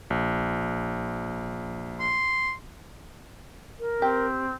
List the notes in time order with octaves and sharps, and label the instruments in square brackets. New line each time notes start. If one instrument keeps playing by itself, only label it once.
[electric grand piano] A#1
[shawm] C6
[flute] A#4
[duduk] C4 [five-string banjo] G4